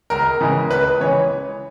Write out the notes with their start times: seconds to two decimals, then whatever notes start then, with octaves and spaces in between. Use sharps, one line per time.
0.10 C#2 A#4
0.41 C#3 E3 G#3
0.71 C#2 B4
1.01 C#3 E3 G#3 C#5